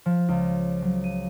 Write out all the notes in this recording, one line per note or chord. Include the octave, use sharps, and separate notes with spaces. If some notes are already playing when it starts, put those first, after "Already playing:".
F3
C#2
F#3
D#7